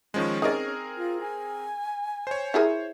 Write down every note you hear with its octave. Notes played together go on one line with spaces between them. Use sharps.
D#3 F3 G#3 C#4
C4 D#4 G#4 A#4 D5
F4
G#5
C5 C#5
E4 G#4 A#4